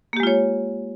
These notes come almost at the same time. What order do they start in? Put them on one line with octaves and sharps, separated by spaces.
A#3 G4 G#3 F4 C#5